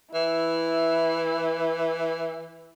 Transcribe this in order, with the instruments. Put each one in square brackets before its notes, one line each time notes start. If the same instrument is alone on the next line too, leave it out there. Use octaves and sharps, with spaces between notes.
[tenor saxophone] E3 [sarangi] E4